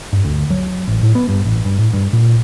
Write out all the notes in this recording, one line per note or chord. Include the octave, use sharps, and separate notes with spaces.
G2
D2
F#3
A1
A2
B3
G2
A1
G2
A2
G2
A#2